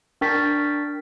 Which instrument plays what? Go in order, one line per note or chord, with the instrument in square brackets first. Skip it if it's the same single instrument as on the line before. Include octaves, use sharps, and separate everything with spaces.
[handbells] D4 A#4 G5 C#6 A6 B6